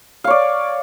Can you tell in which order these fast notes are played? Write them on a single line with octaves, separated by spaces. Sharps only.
F5 C#5 D5